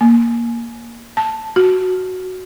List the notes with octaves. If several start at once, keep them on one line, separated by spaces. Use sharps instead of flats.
A#3
A5
F#4